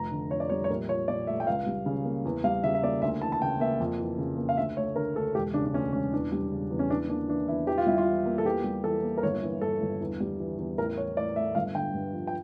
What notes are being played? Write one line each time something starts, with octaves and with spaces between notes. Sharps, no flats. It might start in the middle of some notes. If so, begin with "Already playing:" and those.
Already playing: F1 A#5
D3
F2 C#5
D5
G3 C#5
C#5
A#1 A#4
F3 C#5
A#2 D5
A3 E5
G5
C#2 F5
G3
C#3
A#3
E2
G3 F5
C#3 E5
E5
A#3 D5
D2 E5
E3 A5
A5
C#3 G5
A#3 E5
F2
E3
C#3
A#3
F5
D2 E5
A3 C#5
D3 A#4
D2 A4
E1 G4
C#3 D4
D4
D2 C#4
E1 C#4
E2 D4
G3
C#3
E2
C#4
E2 D4
A#3 D4
E3 D4
E2 E4
E2 G4
F4
G3 E4
F4
E3
A#3
A4
E2 G4
G3
E3 A4
A#3
A#4
G1 C#5
E3
G2 A4
G1
E2
G3
E3
E2
A1 A#4
E3 C#5
A2 D5
A3 E5
G1 F5
D3 G5
G2
F3
G5